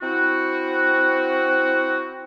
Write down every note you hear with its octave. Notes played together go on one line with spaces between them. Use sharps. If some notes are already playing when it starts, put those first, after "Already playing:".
C4 E4 F#4